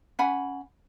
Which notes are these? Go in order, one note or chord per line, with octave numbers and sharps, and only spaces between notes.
C#4 F#5 G#5 B5